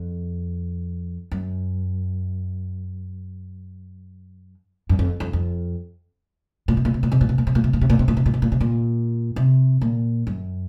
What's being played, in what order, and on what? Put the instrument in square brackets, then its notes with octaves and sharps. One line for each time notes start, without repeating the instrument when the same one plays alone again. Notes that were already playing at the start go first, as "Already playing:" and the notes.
Already playing: [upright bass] F2
F#2
F#2
F2
F2
F2
A#2
C3
A#2
C3
A#2
C3
A#2
C3
A#2
C3
A#2
C3
A#2
C3
A#2
C3
A#2
C3
A#2
C3
A#2
C3
A#2
C3
A#2
F#2